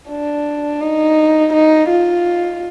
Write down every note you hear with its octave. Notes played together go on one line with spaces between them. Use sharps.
D4
D#4
D#4
F4